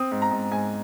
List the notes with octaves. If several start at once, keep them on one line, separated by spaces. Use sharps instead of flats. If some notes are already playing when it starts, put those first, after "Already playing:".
Already playing: C4 D#6
G#2
A#5
G#2
G#2 G#5